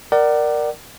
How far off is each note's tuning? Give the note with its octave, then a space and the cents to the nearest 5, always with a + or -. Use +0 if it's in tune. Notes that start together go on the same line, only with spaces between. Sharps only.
A#4 +0 D5 +15 F#5 +30